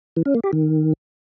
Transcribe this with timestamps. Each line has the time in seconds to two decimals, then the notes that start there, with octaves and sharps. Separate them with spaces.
0.16 E3
0.26 C#4
0.35 A#3
0.44 G4
0.53 D#3